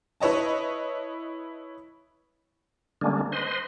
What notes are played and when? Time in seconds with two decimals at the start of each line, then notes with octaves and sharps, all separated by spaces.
0.20 E4 B4 C#5 D#5 A5
3.01 D3 G3 G#3 A#3 C#4 D4
3.32 B4 C5 D#5 C6